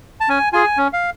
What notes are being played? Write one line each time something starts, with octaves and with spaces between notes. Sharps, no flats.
A5
C#4 G#5
F4 G#4 G#5
C#4
F5